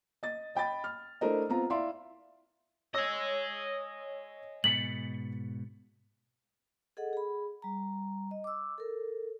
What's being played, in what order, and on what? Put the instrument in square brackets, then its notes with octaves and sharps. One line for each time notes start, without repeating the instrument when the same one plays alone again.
[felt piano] D#5 A6
D#5 G5 B5 A6
F6
A3 D4 E4 A#4 C5 D#5
B3 C4 F4 A#5
E4 D5 E5 F5 C6
[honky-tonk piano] C#5 E6 A#6 [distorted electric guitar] D#5 G#5
[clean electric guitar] G#2 B2 [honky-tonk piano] A6 B6 C#7 [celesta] F#7
[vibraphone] G#4 A4 D#5 F#5
G#4 B5
G3 A#5
D#5
D6 E6
A4 A#4